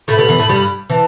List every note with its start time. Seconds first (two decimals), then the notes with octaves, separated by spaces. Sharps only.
0.08 A2 A3 B5
0.18 G2 G3
0.29 E2 E3
0.38 A2 A3
0.49 G2 G3
0.90 E3 A5